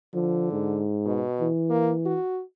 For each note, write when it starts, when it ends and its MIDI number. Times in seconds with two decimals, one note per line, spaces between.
0.14 0.83 50
0.14 0.47 53
0.52 1.24 44
1.06 1.47 47
1.40 2.18 52
1.70 1.93 58
2.06 2.41 66